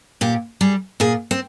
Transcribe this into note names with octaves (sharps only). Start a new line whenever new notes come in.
A#2 G4
G3 G#4
A#2 G#4
C4